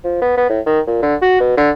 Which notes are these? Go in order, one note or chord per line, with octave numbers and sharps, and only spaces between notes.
F3
B3
B3
A2
D#3
A#2
D3
F#4
B2
D3